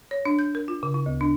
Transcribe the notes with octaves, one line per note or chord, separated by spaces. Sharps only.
C#5
D4
G6
A#4
F4
C#3
E4
D2
D4